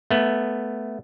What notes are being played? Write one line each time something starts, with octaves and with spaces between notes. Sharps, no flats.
A3 B3